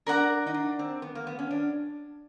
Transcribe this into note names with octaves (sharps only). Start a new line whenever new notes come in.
D4 A#4 D5 F#5 A#5
D#4
D4
C4
B3
A#3
B3
C#4
D4